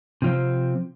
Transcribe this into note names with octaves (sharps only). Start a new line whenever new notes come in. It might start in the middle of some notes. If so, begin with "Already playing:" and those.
C3 F3 C4